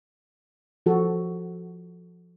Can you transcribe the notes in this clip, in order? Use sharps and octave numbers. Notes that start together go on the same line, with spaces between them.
F3 F#4 A4